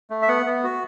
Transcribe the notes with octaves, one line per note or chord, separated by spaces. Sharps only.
A3
E5
B3 F#5
B3
F#4